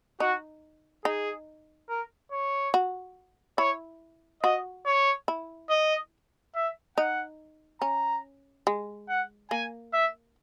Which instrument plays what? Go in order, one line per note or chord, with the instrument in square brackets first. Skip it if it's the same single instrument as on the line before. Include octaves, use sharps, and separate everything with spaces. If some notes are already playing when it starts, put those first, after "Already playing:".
[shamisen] D#4 [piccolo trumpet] F#4
[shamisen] D#4 [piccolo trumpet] G#4
[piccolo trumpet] A#4
C#5
[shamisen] F#4
[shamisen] E4 [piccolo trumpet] C#5
[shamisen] F#4 [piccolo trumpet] D#5
[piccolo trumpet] C#5
[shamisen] E4
[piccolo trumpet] D#5
E5
[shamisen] D#4 [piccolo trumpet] F#5
[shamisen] C#4 [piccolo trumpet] A#5
[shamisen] G#3
[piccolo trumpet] F#5
[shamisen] A#3 [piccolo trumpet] G#5
[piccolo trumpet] E5